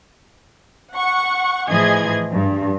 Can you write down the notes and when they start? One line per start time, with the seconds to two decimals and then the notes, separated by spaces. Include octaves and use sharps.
0.93 F#5 C#6
1.69 A2 E3 F3 G#4 D#5 G#6
2.32 G2